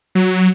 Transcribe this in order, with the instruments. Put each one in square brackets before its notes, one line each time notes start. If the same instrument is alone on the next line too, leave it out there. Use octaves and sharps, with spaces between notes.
[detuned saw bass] F#3